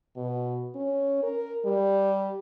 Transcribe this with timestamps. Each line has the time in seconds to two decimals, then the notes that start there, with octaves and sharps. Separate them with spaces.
0.16 B2
0.75 C#4
1.23 A#4
1.65 G3